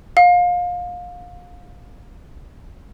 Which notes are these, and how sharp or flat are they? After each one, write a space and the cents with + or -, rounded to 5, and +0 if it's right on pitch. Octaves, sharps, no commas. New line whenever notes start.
F5 +25